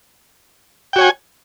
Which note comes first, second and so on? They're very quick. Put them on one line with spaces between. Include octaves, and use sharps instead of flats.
G5 F#4 C#5 G#5